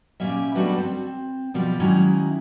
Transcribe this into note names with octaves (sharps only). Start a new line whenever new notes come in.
A#2 G3 A#3 C#4 E5
G3 A3 B3 D4 F#4 B4
C4
B2 F3 G3
D#3 F#3 G#3 C#4 D#4 E4